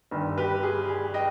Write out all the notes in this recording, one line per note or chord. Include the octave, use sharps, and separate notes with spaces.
G1 G2 D#3 G3
G4 B4
G#4
G#4
D#5 G5